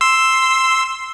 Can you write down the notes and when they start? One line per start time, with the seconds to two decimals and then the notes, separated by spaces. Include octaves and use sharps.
0.01 C6 E6